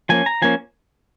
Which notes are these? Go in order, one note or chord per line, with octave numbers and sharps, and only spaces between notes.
F3 A#3 C#4 G#5
A#5
F3 A#3 C#4 G#5